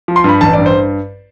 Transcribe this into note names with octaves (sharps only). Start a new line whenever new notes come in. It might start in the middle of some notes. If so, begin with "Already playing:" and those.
F3
C6
G2 B5
A1 A5
G2 D5
C5